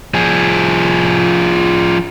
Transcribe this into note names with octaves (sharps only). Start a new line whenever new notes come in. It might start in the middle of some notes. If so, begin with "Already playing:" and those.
F3 G#4